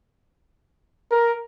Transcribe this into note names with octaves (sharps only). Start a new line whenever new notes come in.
A#4